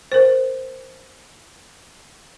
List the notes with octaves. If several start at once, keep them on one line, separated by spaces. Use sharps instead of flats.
A#4 C5